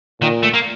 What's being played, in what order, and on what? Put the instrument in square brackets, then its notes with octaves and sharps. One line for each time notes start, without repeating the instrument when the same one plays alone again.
[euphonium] A#2 [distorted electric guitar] D#3
[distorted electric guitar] A3
A#3